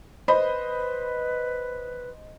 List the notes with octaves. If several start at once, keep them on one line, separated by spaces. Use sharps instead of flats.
B4 C5 D#5 B5